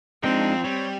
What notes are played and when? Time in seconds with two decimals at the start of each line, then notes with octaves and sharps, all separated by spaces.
0.24 F3 G#3 C4 D4 D#4 G5
0.64 G3 C#5